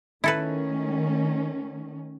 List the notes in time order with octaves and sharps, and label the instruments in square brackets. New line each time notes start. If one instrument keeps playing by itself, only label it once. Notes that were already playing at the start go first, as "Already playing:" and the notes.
[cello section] D#3 A3 C#4 [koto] E4 A4 B4